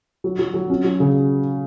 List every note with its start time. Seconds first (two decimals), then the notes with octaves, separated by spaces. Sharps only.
0.24 F#3
0.39 F#3
0.54 F#3
0.70 C#4
0.84 F#3
1.00 C#3